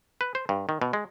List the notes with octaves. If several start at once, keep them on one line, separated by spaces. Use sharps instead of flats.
B4
C5
G2
D#3
B2
G#3